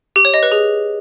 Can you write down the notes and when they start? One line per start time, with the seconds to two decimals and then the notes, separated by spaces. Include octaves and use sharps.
0.16 G4
0.25 C#5
0.34 D#5
0.43 B4
0.52 G#4